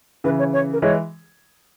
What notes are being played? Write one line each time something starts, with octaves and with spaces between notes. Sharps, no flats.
C#3 E3 B4
C#5
C#5
A#4
E3 G#3 C#5